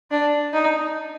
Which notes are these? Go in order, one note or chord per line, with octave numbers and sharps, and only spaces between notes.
D4
D#4